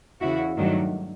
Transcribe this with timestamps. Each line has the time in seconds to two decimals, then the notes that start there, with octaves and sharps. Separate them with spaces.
0.21 E2 C#3 E3 E4 F#4
0.57 G2 D#3 F#3 A3 D4